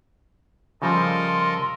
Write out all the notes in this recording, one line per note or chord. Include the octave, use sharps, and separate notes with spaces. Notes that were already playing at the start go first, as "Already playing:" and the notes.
C#3 F3 G3 A4 A#4 D#5 C6